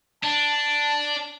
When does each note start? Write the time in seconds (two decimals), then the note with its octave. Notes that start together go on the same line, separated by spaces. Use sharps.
0.24 D4 A5